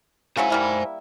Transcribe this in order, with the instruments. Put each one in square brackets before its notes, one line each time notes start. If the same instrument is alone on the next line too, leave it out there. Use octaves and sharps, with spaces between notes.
[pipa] C#3 F#3 E4 [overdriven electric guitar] C5 G#5
[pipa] G3 A#3 E4